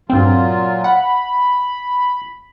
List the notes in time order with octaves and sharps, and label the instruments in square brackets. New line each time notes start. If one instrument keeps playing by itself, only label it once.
[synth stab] G2 C4 [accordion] A#2 F#3 F4
[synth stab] F#5 [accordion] B5